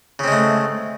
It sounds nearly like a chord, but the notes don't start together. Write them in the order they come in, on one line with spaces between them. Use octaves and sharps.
C#3 C4 G#3 A3